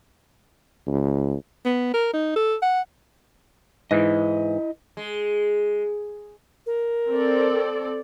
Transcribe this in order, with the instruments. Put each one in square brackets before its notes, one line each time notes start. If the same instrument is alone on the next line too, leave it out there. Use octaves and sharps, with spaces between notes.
[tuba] C#2
[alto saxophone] B3
A#4
D#4
A4
F#5
[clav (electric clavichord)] G#2 E3 [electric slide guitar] E4 D#5
[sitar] G#3
[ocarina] A#4
[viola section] C4 A4 D5